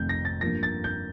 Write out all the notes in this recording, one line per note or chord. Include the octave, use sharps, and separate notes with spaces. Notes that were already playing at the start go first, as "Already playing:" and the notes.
Already playing: F1 F2 D#3 A3 C4 G6
A#6
A6
G2 F3 A#3 A#6
A6
G6